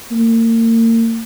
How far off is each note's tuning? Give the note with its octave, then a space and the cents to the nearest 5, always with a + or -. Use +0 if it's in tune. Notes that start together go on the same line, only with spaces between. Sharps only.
A#3 -40